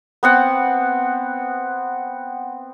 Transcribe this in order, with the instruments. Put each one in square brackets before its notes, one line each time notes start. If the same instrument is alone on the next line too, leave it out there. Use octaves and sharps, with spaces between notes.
[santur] B3 C4 F#5